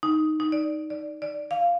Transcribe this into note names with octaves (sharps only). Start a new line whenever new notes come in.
D#4
D#4
D5
D5
D5
F5